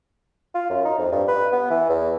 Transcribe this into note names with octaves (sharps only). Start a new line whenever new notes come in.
F4
F#2
D#4
F2
G2
B4
B3
E3
E2